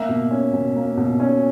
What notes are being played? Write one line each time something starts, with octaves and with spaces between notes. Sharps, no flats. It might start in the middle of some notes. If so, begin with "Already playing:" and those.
Already playing: A#3 E5
B2
C#4
B2
A#3
B2
C#4